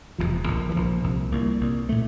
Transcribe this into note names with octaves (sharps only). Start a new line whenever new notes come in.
E1 D2 C3 F3
A#1 A#2
E3
A#1 A#2 F3
C2 A#2
C2 A#2 A#3
C2 A#2
A#2 A3